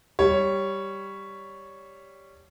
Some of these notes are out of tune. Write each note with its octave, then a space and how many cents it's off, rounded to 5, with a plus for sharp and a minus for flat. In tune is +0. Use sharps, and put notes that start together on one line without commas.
G3 +0 C#5 +0